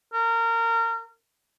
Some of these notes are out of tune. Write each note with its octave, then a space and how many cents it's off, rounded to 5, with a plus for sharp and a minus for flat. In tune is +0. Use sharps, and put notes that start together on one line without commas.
A#4 -25